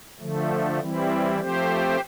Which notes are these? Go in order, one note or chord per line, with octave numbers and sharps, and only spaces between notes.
D3 F3 A3
E3 G3 C4 E4
F3 A3 C4 G4 C5